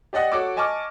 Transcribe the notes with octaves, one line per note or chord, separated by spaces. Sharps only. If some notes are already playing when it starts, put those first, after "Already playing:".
G4 D5 D#5 F#5 D#6
F#4 A4 C#5 D6
D#5 G#5 A5 C#6 D6 F6